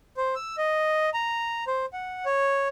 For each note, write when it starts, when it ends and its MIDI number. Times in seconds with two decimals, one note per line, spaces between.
0.17 0.35 72
0.35 0.56 88
0.58 1.10 75
1.14 1.64 82
1.67 1.86 72
1.93 2.25 78
2.25 2.68 73